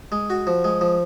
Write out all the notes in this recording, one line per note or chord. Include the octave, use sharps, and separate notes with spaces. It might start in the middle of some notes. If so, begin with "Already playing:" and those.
G#3
F#4
F3
G#3
F3